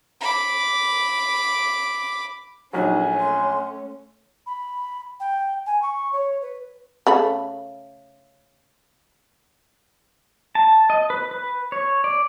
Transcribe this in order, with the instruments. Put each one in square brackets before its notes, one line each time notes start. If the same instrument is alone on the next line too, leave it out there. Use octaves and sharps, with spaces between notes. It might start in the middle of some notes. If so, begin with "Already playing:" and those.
[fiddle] B5 D6
[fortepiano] A#1 F#3 [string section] A3 C#4 [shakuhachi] D#4 [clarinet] G#5
[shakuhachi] C6
[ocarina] B5
G5
G#5
C#6
C#5
B4
[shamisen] C#3 A3 B5
[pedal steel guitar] A5
D#5
B4
B4
C#5
D5